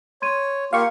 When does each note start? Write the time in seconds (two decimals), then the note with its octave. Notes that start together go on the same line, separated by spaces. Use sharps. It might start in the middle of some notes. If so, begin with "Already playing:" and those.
0.22 C#5 C6 G#6 D#7
0.73 A#3 F4 G4 F5 C#6